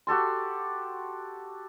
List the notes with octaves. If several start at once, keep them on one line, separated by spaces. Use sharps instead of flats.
F#4 G4 A4 C6